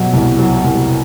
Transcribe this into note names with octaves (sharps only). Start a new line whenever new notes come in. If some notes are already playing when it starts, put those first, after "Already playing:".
Already playing: B2 F#3
C2
F#3
C2